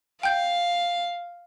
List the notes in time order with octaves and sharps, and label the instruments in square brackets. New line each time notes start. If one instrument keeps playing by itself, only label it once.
[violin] F5 [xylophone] G5 G6